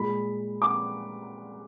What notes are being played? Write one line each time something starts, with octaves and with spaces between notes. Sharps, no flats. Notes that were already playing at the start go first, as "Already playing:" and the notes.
Already playing: A#2 G#3 B5
D6